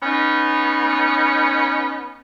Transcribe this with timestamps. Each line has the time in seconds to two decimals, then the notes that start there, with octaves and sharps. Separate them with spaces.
0.03 B3 C#4 D#4